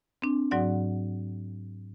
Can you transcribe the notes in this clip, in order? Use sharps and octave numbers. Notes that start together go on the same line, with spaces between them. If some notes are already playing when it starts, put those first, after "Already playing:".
C4 D4
G#2 F#3 F#4 D5 F#5